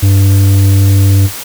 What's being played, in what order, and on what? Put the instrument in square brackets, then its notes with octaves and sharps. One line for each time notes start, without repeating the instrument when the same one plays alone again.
[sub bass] G2